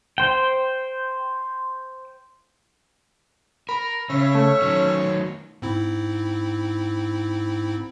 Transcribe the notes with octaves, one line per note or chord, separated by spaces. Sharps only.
C5 G5
A#4 B5
C#3 C#4 C#5 E5
A3
D#3 F#3
G#2 C4 E4